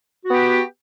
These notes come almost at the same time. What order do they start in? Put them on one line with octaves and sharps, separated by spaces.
F#4 B3 G4